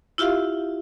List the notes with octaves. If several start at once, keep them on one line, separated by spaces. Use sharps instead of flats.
E4 F4 G4 E5 F5